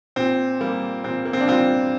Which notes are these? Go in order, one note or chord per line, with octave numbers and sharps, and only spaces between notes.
A#2 C4
G3 A#3
A#2 C4
A#3
C4
D4
G3 C4 F4